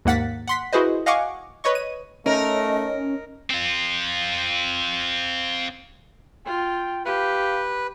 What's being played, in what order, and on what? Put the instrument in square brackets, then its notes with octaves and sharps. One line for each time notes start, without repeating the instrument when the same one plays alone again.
[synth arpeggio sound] D#2 G#2 A#3 F#5 A6 B6
F#5 C6 B6
E4 F#4 G#4 B4 C5 D#5
D#5 F5 F#5 G#5 C#6 D6
B4 C#5 D#5 C#6
D#7
[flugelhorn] A3 [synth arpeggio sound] C#4 [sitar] D#4 A#4 [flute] D#5
[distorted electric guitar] C4 F4
[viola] F4 [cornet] G5
[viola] G4 [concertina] B4 [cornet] F5